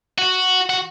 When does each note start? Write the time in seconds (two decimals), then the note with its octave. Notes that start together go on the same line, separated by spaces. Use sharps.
0.18 F#4
0.70 F#4